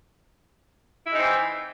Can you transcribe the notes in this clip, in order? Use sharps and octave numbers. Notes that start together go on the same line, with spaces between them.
E3 G#3 C4 D#4 E4